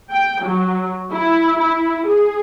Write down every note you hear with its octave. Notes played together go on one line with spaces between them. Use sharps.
G5
F#3
E4
E4
G#4